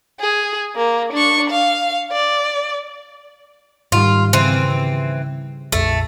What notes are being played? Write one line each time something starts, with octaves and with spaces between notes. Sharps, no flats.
G#4
A#3
D4 C#6
F5
D5
G#2 D#3 G3 F4
C#3 E3 C4
A#1 F2 A3